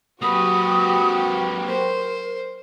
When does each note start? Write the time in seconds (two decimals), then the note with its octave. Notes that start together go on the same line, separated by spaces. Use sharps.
0.22 F#3 A#3 F#4 G4 B4 D#6
1.68 A#4 C5